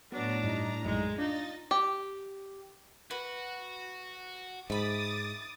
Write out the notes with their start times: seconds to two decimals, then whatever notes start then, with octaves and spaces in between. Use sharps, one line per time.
0.12 A2 F#3 B3 D4 A#5
0.44 G2 D#4
0.85 A#1 F#2 G#3 D#4
1.18 D4 D#4 F4 D#5 A6
1.71 G4
3.11 F#4 B4
4.70 G#2 E5 B5 D6 D#6 A6